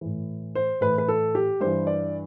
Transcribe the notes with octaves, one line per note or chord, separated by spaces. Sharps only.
A2 E3
C5
A2 E3 B4
B4
A4
G4
G2 E3 C5
D5